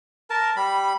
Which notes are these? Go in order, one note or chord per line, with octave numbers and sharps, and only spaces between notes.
A#4 A5
G3 B5